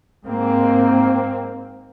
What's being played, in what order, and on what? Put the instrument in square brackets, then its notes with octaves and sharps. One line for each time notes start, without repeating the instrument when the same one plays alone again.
[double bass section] G#2 A#3 C4